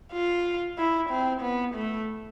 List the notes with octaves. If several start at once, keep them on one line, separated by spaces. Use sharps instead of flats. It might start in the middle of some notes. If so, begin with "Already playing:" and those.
F4
E4
C4
B3
A3